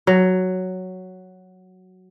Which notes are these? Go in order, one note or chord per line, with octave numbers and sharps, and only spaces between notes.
F#3